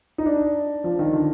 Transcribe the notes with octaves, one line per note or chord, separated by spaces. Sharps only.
D#4
D4
F3
D#3
D3